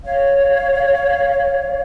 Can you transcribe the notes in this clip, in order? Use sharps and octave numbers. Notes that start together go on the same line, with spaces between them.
C#5 F5